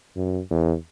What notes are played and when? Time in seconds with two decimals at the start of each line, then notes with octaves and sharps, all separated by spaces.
0.16 F#2
0.50 E2